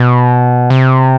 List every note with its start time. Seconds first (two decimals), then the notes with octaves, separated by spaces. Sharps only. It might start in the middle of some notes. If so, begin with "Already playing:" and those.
Already playing: B2
0.70 C3